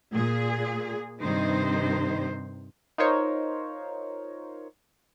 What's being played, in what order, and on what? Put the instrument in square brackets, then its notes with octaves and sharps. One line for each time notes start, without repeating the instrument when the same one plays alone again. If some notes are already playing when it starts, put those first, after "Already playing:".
[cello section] A#2 G#4
G2 C3 D#3 D#4 C5
[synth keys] D#4 F4 A#4 C5 C#5